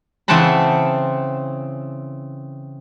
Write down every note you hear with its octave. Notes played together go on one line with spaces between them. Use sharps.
C#3 E3 C4 F#5 A5 B5